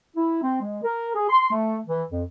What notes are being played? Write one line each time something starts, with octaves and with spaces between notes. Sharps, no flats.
E4
C4
G#3
A#4
G#4
C6
A3
E3
F2